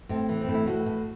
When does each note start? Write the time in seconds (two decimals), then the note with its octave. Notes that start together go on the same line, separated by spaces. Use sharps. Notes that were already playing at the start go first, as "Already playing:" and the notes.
0.09 A2 C4
0.29 E3
0.42 C4
0.48 A2
0.54 E4
0.67 A2 F#4
0.86 A2